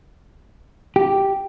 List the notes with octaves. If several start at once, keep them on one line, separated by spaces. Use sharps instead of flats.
G4